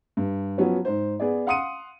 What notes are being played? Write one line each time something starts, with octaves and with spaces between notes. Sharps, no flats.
G2
F3 F#3 B3 C#4
G#2 C5
B3 G#4 D5
F5 F#5 C6 D#6 C#7 D#7